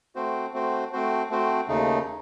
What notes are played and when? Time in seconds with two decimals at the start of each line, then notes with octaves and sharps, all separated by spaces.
0.15 A3 C4 F#4 C5
0.54 A3 C4 F#4 C5
0.93 A3 C4 F#4 C5
1.30 A3 C4 F#4 C5
1.68 D#2 C#3 A3 D#4